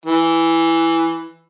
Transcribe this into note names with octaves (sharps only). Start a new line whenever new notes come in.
E3